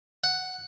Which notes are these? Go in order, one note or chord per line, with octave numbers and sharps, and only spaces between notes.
F#5